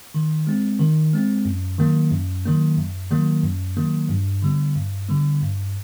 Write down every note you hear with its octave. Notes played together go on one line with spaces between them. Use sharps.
D#3
G#3 C4
D#3
G#3 C4
F#2
D#3 F#3 A#3
F#2
D#3 F#3 A#3
F#2
D#3 F#3 A#3
F#2
D#3 F#3 A#3
G2
D3 G3 B3
G2
D3 G3 B3
G2